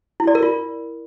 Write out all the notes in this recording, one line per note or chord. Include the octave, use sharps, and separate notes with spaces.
E4
D5
A#4
F4